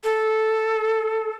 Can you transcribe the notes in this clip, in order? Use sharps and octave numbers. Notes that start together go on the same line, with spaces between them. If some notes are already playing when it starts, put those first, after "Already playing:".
A4